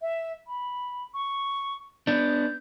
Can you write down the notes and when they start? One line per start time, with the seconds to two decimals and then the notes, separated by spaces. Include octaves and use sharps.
0.02 E5
0.47 B5
1.14 C#6
2.07 B3 D4 G6